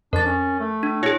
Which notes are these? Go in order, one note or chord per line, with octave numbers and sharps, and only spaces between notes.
F2 D4 A#4 A6
C#4
A3
D4
B2 E4 G#4 C#5